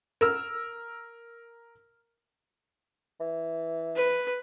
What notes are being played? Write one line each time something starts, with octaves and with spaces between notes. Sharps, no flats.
A#4 E6 F6
E3
B4